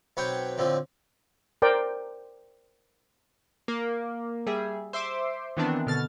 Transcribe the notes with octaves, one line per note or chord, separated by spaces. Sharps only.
B1 C4 B4 C#5 F#5 G5
A2 D3 F3 C4
A#4 C5 D5 G5
A#3
G3 G#4 E5
C5 E5 C6 D6
D#3 E3 B3 C4 D4
B2 D3 F6 A6